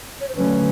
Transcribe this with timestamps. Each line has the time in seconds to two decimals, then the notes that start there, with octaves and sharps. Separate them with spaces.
0.21 C#5
0.29 C5
0.35 D3 F#3 A3 C#4 B4